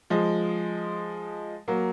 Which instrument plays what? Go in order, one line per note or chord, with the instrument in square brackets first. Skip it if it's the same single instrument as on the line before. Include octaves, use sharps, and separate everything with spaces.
[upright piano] F3 G#3
F#3 A#3